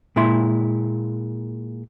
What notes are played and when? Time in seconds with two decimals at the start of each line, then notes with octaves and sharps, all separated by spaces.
0.16 A#2 G#3 E4 C6